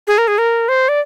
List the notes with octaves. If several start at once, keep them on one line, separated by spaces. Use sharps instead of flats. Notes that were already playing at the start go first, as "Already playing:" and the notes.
G#4
A#4
G#4
A#4
C5
D5